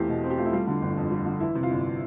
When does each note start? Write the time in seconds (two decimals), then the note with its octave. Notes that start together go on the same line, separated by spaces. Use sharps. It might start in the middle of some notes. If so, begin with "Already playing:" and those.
Already playing: E2 A3 C4 E4 F4 G4
0.09 B2
0.24 C4
0.30 G4
0.38 A3 F4
0.46 E4
0.52 G3 F4
0.67 D3
0.82 G1
0.97 F2
1.11 G3
1.26 D3
1.40 E3 E4
1.55 C3
1.63 F4
1.71 G1